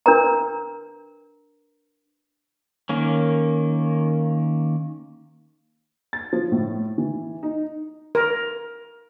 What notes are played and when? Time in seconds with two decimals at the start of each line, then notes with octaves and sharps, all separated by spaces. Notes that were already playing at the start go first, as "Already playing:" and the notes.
0.06 D4 A#4 B4 A#5
2.89 D#3 A#3 C#4
6.13 A6
6.33 F3
6.52 A2
6.98 E3
7.43 D#4
8.15 A#4